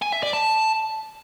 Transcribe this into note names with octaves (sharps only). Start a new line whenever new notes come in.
G#5
E5
D5
A5